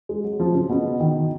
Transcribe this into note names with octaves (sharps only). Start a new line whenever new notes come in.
G#3
F#3
F3
C#3
B2
D#3